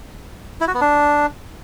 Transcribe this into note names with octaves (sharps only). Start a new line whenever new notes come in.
E4
F#4
B3
D4